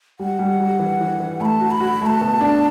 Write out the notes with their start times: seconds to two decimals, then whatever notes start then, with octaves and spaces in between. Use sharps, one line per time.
0.19 G3 F#5
0.39 G3
0.60 G3
0.79 E3
1.01 E3
1.20 E3
1.40 A3 B5
1.45 A5
1.60 F#4
1.71 B5
1.80 F#4
2.01 A3 A5 B5
2.21 B2
2.41 D4